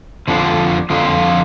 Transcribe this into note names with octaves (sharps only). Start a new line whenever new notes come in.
F2 D3 F3 D4 F4
F2 D3 F3 D4 F4